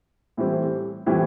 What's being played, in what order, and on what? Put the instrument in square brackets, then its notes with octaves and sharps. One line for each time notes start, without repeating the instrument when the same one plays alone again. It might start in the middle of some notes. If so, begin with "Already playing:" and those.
[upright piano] A2 E3 G3 C4 G4
A2 E3 G3 C4 G4